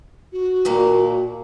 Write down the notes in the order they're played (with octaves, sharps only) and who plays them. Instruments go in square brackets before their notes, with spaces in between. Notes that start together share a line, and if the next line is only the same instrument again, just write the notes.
[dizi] F#4
[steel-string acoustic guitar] D#2 A#2 A#3